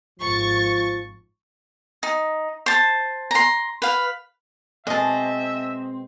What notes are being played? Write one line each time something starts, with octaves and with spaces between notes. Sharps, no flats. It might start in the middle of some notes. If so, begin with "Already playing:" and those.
G#1 F3 C#6 A6
D#4
C5 A5
A#5 C6
B4 F5
B2 G#3 C4 D#5 E5 A5